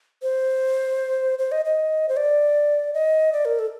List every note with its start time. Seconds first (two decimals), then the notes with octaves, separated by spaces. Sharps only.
0.22 C5
1.39 C5
1.52 D#5
1.65 D#5
2.09 C5
2.17 D5
2.94 D#5
3.33 D5
3.45 A#4
3.59 A4